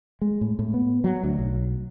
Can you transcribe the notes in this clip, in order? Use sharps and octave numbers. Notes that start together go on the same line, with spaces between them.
G#3
A2
A2
B3
F#3
D2
B1